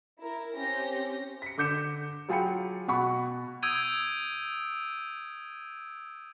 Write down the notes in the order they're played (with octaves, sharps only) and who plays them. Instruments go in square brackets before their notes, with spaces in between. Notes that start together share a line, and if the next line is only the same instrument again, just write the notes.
[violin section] E4 A#4
C4 C#4 G4 A#6
[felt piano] B6 C#7
D3 D6 G6 C#7 E7
F#3 F4 G#4 G5 B5 C#7
B2 F#5 B5 C#6
[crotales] D#6 E6 G6 G#6 D7 D#7